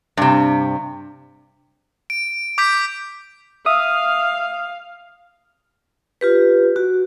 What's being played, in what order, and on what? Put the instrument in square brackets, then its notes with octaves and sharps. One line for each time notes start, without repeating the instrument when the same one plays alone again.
[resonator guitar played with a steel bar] G2 C3
[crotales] D7
D6 G6 B6 D7
[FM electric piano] E5 D#6 [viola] F5
[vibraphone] F4 G4 B4
F#4